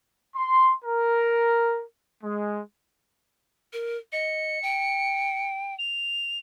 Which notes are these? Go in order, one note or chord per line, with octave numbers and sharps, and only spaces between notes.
C6
A#4
G#3
A#4
D#5 C#7
G5
F7